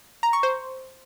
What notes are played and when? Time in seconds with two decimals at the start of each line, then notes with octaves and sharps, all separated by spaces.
0.23 A#5
0.33 C#6
0.43 C5